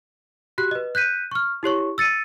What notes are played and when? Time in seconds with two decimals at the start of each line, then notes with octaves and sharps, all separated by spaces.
0.58 F#4 G4 F#6
0.71 B4 D#5
0.95 F#6 G6 B6 D#7
1.31 C#6 F6
1.63 E4 G4 C#5 C#6
1.98 E6 A6 C#7 D#7